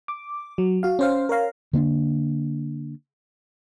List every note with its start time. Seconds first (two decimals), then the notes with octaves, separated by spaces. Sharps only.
0.08 D6
0.58 F#3
0.83 F#4 F5
0.99 C#4 C5 F5
1.29 A#4 C#5 F5 A#5
1.73 D3 A#3 C4 D4